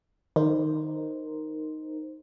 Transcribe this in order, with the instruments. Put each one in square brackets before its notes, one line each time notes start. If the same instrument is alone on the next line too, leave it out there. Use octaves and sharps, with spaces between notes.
[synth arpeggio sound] D#3 [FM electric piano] D#4 A#4 C5